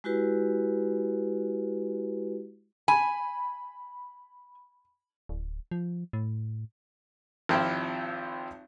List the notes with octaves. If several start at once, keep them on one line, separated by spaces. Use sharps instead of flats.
G#3 E4 F#4 G4 B4
G#5 B5
D1
F3
A2
G#1 F3 C4 E4 F4 G4